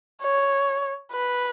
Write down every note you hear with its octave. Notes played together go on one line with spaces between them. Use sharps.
C#5
B4